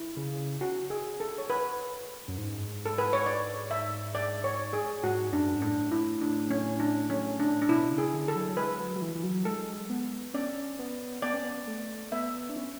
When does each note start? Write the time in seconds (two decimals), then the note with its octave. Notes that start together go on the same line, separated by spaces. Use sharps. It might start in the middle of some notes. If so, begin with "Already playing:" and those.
Already playing: E4
0.17 C#3
0.61 F#4
0.90 G#4
1.20 A4
1.38 C#5
1.50 B4
2.28 F#2
2.38 G#2
2.86 A4
2.98 B4
3.13 C#5
3.26 D5
3.71 E5
4.15 D5
4.44 C#5
4.73 G#4
5.04 G#2 F#4
5.32 F#2 D4
5.46 F#2
5.55 G#2
5.62 A2 D4
5.92 E4
6.21 D4
6.51 C#4
6.80 D4
7.10 C#4
7.40 D4
7.62 D4
7.68 B2 E4
7.91 C#3
7.98 G#4
8.14 D3
8.28 A4
8.36 F#3
8.49 F#3
8.57 G#3 B4
8.79 F#3
8.96 F#3
9.02 E3
9.15 E3
9.23 F#3
9.45 G#3 A4
9.90 B3
10.34 C#4 D5
10.79 B3
11.22 B3 D5
11.34 C#4
11.44 B3
11.67 A3
12.12 B3 E5
12.49 D4
12.56 C#4